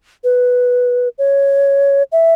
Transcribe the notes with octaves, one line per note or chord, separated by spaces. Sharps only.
B4
C#5
E5